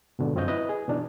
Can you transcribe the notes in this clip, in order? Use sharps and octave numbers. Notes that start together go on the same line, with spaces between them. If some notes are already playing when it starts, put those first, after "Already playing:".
G#2 B2 D3
F#2 C4 F4 C#5 D#5 G6
E4 B4 D#5
G#4
B2 E3 D4 D#4